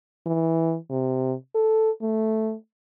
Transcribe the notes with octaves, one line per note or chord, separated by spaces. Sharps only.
E3
C3
A4
A3